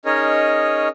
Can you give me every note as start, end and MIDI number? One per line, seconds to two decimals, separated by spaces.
0.05 0.88 61
0.05 0.88 63
0.05 0.88 68
0.05 0.88 70
0.05 0.88 73
0.05 0.88 75